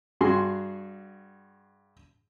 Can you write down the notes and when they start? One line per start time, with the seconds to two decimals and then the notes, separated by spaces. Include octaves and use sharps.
0.21 G2 F#4 G#4 C6